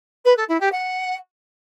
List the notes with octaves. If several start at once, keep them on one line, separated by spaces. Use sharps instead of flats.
B4
A4
E4
G4
F#5